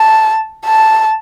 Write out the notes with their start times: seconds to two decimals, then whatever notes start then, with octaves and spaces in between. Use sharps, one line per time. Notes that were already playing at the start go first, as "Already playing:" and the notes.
Already playing: A5
0.65 A5